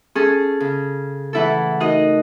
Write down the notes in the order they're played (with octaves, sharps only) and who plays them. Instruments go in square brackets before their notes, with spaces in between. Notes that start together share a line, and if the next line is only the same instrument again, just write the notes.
[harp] C#4 G#4 A4
C#3
[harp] E3 E4 A4 [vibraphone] A3 F#5
[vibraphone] A3 D#4 A#4 [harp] F#4 D#5